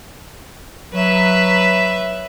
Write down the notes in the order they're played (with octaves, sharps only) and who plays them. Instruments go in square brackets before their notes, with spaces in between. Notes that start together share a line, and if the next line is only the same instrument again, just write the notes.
[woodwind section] F#3 [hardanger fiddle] B4 E5